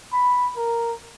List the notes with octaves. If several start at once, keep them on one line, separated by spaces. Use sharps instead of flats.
B5
A#4